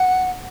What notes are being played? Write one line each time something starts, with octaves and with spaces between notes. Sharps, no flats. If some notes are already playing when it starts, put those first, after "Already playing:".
Already playing: F#5